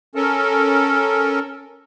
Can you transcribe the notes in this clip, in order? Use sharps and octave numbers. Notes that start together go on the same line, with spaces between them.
C#4 A4 A#4